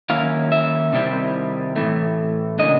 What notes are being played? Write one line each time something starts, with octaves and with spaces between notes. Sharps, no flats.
D#3 F#3 A#3 C#4 E4 F5
E5
C3 D#3 G3 C4 E4
A2 E3 A3
C#3 F#3 A#3 D4 D#5